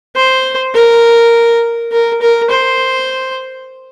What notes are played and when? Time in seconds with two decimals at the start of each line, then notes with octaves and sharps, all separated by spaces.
0.16 C5
0.75 A#4
1.92 A#4
2.22 A#4
2.51 C5